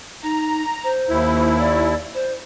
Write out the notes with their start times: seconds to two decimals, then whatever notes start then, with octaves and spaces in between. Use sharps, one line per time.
0.23 D#4 A#5
0.84 C5
1.09 D#2 E4
1.59 D5
2.14 C5